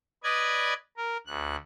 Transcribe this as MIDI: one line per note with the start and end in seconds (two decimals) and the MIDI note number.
0.24 0.74 71
0.24 0.74 74
0.24 0.74 75
0.24 0.74 92
0.97 1.17 70
1.27 1.56 38
1.27 1.56 90